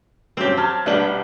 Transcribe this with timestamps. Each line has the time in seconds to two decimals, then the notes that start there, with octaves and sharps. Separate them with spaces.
0.37 G2 F#3 C4 C#4 G4
0.57 F#3 A5 F6 G#6
0.86 C2 B2 G3 D4 G5 F#7